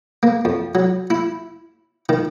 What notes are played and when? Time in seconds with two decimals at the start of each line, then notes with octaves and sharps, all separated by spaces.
0.23 A#3
0.45 F2
0.75 F#3
1.10 E4
2.09 D#3